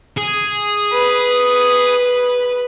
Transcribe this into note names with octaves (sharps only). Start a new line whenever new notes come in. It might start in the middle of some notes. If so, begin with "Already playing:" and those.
G#4
B4